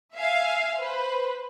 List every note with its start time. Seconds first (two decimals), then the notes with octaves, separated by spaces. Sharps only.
0.14 E5 F5 G#5
0.77 B4 C5